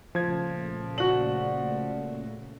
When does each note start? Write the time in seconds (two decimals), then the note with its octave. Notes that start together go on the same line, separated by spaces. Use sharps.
0.15 A#2 C#3 F3 A3 G#6
0.98 F#4 D5 F#5 F#7